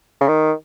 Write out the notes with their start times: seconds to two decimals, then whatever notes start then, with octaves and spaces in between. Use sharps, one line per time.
0.21 C#3
0.28 D#3